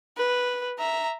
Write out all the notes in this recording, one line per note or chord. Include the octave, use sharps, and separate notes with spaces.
B4
E5 A#5